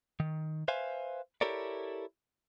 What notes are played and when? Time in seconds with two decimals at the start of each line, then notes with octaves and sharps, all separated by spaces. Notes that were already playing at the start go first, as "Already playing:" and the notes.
0.20 D#3
0.68 B4 C5 E5 F5 G#5
1.41 E4 G4 A4 A#4 C#5 D5